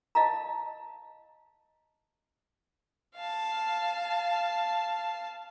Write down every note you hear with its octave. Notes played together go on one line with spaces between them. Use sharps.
D#5 F5 A5 A#5
F5 A5